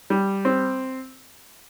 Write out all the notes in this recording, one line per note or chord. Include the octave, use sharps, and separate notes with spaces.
G3
C4